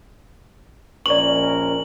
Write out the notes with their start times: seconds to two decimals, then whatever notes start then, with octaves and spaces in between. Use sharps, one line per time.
1.06 A#1 C#4 A#4 D5 C#6 F#7